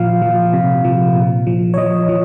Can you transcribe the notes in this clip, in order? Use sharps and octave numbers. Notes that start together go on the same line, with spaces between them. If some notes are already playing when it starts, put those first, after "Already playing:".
Already playing: A#2 F3 F5
F3
C3
F3
A#2
F3
C#5
F3 D#5
F3